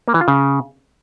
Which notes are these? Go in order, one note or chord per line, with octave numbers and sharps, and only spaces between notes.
A#3
E3
F4
C#3